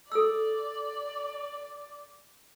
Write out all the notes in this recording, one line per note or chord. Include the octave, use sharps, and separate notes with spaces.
A4 D5 E6